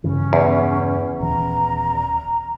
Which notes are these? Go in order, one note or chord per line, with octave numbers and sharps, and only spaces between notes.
G2 C#3 E3 C#4
E2
D#1 E3 C#4 A#5